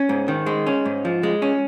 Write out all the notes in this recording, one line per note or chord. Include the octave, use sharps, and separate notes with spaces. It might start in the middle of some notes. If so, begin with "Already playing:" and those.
Already playing: C#4
G#2
D#3
G#3
C#4
G#2
F3
G#3
C#4